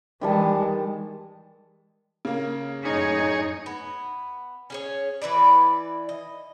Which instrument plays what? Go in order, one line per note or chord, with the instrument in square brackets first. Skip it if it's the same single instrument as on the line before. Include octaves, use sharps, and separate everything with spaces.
[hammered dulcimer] D#3 G3 A5 [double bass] E3 G#3
[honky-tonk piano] C#3 A#3
[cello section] F#2 A2 D#4 [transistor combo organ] G#4 C#5
[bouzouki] B3
C#4 G#4 C#5
E3 E4 B4 D5
D#5